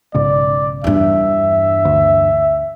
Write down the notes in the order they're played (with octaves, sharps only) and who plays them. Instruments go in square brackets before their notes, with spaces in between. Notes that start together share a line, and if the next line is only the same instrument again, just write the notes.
[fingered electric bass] B1 G#2 C#3 [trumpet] D5
[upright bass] E2 G2 [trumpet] E5
[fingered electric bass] D2